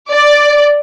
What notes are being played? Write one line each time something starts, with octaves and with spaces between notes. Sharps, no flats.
D5